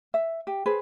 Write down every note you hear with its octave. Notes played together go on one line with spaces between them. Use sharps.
E5
G4
G#4 B4 C5